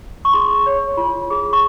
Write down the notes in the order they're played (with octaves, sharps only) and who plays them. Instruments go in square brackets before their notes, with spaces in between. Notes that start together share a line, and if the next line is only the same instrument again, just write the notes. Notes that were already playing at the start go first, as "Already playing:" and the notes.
[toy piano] C#6
G#4 C6
C#5
F4
G#4
C#6